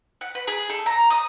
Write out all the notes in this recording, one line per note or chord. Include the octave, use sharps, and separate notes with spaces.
F#5
B4
G#4
A4
A#5
D#6